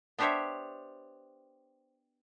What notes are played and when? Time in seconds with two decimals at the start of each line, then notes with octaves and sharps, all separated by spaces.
0.19 B3 D4 G4 C5 C#5 E5